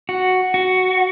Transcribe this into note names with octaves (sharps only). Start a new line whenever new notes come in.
F#4
F#4